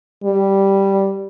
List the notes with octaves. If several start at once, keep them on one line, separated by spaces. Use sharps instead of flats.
G3